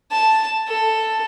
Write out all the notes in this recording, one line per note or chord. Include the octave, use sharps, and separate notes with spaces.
A5
A4